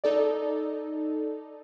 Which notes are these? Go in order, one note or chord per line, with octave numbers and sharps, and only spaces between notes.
D#4 A4 D5